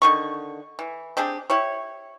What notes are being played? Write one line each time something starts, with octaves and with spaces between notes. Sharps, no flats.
D3 D#3 C#6
E3
C4 D4 G4 G#4
E4 G4 C#5